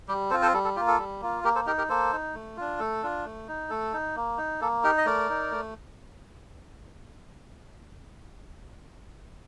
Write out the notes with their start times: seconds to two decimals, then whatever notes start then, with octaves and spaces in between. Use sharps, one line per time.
0.08 G3 G4
0.31 C4 A4 C5
0.33 F4
0.42 A4 C5
0.54 G3 A4
0.64 A4
0.76 A#3 F4 G4
0.88 A4
0.99 G3
1.21 A#3 F4
1.44 A#3 G4 A#4
1.55 A4 C5
1.66 D#4 G4 A#4
1.78 G4 A#4
1.89 A#3 A4 C5
2.13 D#4
2.35 A3
2.57 D4 F4
2.80 A3 A4
3.03 D4 F4
3.25 A3
3.48 D#4
3.70 A3 A4
3.93 D#4
4.16 A#3
4.38 D#4
4.61 A#3 A4
4.84 D#4 G4 A#4
4.98 D#5
5.06 A3 A#4 D5
5.29 D#4
5.51 A3